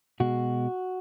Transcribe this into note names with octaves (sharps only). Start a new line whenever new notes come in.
B2 G#3 F#4